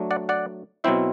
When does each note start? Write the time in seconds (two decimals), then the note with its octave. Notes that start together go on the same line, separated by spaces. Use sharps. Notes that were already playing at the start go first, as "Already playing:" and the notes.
Already playing: F#3 A3 D4
0.11 D5 F#5
0.29 D5 F#5
0.84 B2 F#3 C4 E4 C5 E5